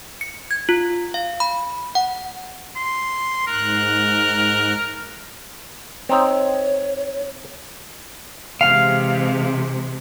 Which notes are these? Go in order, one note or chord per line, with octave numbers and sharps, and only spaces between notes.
C#7
G#6
F4
F5
B5
F#5
C6
G#2 A#4 F#6
C4 D#4 C#5 G5
C3 E3 G#3 F5